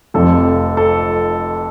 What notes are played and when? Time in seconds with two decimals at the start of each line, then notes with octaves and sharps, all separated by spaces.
0.14 F1 F2 C3 F3 A4
0.77 A4